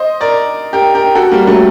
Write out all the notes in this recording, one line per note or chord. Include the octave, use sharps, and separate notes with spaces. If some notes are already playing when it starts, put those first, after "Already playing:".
Already playing: C5 D#5
A#4 D5
G4 A#4
G4 A#4
F#4 A4
G3 A#3
F#3 A3